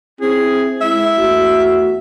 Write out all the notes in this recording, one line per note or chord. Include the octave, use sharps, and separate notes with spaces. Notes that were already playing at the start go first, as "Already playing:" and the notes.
C4 E4 G#4
G#3 E4 E5
E2 A3 F#4